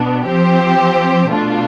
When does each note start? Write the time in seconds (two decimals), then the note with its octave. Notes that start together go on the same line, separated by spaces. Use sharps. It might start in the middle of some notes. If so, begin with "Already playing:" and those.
Already playing: B2 B3 D4
0.26 F3 C4 G4 C5
1.30 B2 A3 D4 F4